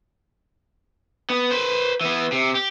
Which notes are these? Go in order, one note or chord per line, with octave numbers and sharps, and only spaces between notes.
B3
B4 C5
E3 B3
C3
G4